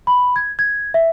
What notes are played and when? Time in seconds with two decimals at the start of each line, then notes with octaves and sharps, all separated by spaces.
0.07 B5
0.36 G#6
0.59 G#6
0.94 E5